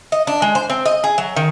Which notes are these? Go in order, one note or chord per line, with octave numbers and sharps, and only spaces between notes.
D#5
D4
G#3
C5
C4
D#5
G#4
F#3
D#3